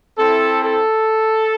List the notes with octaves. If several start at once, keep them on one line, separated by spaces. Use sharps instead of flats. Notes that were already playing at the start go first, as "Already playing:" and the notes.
C4 E4 A4
A4